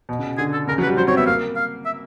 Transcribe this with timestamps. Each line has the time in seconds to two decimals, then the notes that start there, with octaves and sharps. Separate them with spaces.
0.09 B2
0.19 C#3
0.38 D3 G#4
0.53 A4
0.67 C#3 A#4
0.78 F#3
0.83 B4
0.87 G3
0.97 F#3 C5
1.07 C4 C#5
1.17 B3 E5
1.26 A#3 F5
1.56 F5
1.86 E5